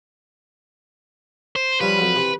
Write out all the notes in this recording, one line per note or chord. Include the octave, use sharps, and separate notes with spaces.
C5
F3 G3 C#4 B4
F2 F#3
C3 E3